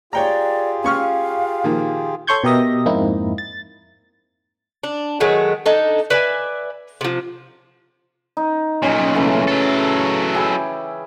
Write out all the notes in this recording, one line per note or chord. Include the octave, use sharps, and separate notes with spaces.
F4 G4 G#4 C#5 D5 G5 A#5
C#4 F5 C#6 F6
A#2 D#3 F3
A4 C#5 C6 C#6 G6 G#6
B2 G4 A#4 D#5 E5 A#6
F2 G#2 A#3 C4 D#4 E4
A6
D4
D#3 F#3 G#3 A3
D4 D#4 A4
B4 D5 E5 G#5
C3 F3
D#4
B1 A#2 C#4 C#5 D#5
C#3 E3 A3
F#3 A4
E4 G4 G#4